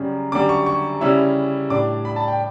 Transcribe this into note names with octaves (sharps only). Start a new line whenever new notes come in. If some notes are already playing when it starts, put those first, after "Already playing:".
Already playing: F#2 C#3 G3 C#4
F#2 D3 G3 D6
C#6
C#6
C#3 G3 C#4 E4 E6
A2 G3 D4 D6
B5
A5
G5